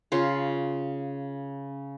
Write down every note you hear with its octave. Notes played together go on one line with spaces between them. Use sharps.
C#3 C#4 F4